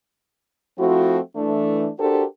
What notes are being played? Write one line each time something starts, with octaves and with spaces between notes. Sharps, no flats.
F3 A3 C4 E4 F#4
E3 A3 D4
D4 F#4 G4 A4 A#4 C5